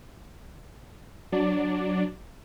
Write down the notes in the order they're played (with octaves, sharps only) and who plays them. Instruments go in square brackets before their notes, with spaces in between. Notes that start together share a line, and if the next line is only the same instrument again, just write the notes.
[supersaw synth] F#3 D4 D5